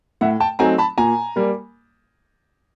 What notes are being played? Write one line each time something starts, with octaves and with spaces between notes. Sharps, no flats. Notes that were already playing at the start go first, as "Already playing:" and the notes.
A2 E5 F#5
G5 A5
F#3 A3 C4 D#4 G#5 A#5
A5 B5
A#2 G#5 A#5
G3 A#3